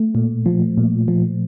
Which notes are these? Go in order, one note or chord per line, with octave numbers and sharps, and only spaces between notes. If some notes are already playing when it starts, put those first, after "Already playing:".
Already playing: A3
A#2
F3
A#2
F3